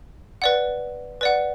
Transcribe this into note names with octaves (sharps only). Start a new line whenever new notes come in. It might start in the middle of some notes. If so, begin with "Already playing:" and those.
B4 D5 F#5
B4 D5 F#5